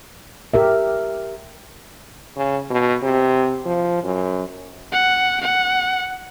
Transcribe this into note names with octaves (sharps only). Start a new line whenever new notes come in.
G4 A#4 E5
C#3
B2
C3
F3
F#2
F#5
F#5